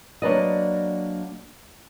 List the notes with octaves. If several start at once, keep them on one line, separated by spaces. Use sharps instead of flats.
F#3 A#3 D4 B4 D5 D#5